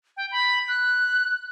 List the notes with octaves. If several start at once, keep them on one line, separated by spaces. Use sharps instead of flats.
G5
B5
F#6